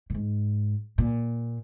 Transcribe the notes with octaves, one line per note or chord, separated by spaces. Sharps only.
A#2
G#2
A#2